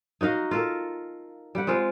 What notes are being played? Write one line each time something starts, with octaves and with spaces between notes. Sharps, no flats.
D#4 F#4 D#5 F5
F4 A4 A#4
G3 F#5
G#3 C4 F4 F5